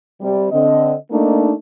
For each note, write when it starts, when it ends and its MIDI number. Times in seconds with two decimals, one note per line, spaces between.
0.21 0.48 48
0.21 0.48 55
0.51 0.94 50
0.51 0.94 60
0.51 0.94 75
1.11 1.52 57
1.11 1.52 58
1.11 1.52 62
1.11 1.52 63